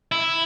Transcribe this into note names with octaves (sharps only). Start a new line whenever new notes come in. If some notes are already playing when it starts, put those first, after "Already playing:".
E4